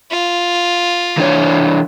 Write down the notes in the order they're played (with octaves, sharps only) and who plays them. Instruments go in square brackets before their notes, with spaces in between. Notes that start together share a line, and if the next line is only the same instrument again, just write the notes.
[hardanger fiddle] F4
[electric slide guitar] E3 D4 C#5